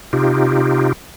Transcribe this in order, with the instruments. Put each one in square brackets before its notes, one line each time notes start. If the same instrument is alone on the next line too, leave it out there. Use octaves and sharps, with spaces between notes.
[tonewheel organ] C3 D#4 F4 G4